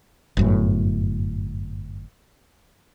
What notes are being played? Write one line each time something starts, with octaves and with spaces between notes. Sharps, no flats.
G1 F#2 A2